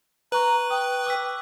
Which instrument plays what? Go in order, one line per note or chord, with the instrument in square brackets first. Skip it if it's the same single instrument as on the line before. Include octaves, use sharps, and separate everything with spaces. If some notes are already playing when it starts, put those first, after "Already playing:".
[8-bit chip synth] B4 [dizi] A#5 [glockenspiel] C#6 F#6 F#7
[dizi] G5 [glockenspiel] D#6
[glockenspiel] D6 E6 B6